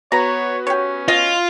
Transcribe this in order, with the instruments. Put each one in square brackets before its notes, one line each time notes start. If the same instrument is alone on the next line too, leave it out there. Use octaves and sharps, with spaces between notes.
[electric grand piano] B3 F#4 B4 [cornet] C#5 [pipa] A#5
[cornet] C#4 [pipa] G4 C#5
[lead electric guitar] F4 [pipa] D#5